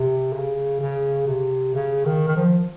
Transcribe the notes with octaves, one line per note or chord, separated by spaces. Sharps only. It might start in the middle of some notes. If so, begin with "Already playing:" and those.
Already playing: C3
C#3
C#3
C3
C#3
D#3
D#3
F3